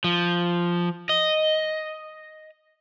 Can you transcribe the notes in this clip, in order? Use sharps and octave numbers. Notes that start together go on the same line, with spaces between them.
F3
D#5